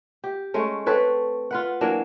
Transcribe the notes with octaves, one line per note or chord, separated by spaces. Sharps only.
G4
G#3 A3 C#4
C4 A4 B4 C#5
F4 B4 F#5
E3 F#3 A#3 D4